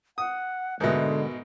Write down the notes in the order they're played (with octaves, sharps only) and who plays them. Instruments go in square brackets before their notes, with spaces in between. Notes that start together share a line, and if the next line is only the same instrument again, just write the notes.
[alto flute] F#5 [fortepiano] D#6
[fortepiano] G#2 B2 [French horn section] D3 [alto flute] G#3 [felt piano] A#4 B4 E5